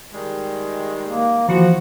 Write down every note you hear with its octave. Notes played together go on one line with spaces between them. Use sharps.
D#3 G3 G#3
A#3
E3 F3 F#4 C#7